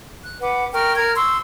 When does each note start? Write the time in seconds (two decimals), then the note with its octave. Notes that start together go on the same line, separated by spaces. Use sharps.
0.22 F#6
0.39 B4 F#5 D6
0.72 A#4 G5 C#6 F6
0.95 A#4 F6 G#6
1.15 C6 C#6 E6